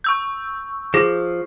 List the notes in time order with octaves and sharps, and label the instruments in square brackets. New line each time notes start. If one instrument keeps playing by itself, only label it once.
[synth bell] C#6 E6 G6
[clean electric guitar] F3 [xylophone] G#4 A#6